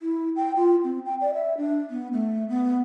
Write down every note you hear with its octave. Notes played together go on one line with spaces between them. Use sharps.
E4
G5
F4
C4
G5
D5
E5
D4
B3
A3
B3